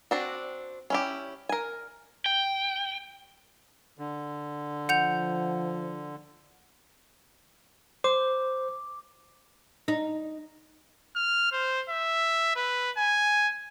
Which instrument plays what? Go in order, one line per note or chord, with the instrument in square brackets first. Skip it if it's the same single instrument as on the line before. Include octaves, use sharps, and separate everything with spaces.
[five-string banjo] C4 D4 F#4
C#4 E4 G4
A#4 G#5
[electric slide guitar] G5
[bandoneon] D3
[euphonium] F3 [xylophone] F#5 G6 F7
[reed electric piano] C5 [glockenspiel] D6
[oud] D#4
[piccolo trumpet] F6
C5
E5
B4
G#5